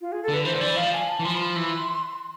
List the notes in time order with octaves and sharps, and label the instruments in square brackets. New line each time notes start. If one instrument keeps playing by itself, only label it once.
[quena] F4
G#4
A4
[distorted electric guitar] D3
[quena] B4
[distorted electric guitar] E3 [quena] C5
[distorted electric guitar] D3
[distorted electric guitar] E3 [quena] D5
[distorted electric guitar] F3 [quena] F5
[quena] G#5
A5
[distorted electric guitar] E3
[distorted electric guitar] F3 [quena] C6
[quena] B5
C6
[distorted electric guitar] E3